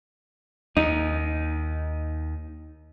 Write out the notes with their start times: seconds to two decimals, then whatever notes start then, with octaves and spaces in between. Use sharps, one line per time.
0.77 D#2 D#4